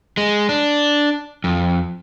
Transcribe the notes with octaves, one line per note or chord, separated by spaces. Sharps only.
G#3
D4
F2